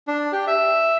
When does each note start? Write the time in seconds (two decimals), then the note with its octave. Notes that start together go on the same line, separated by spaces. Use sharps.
0.08 D4
0.32 G4
0.47 E5